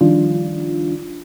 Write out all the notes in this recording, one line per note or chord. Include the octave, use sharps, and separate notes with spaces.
D#3 F3 G3 D4 F4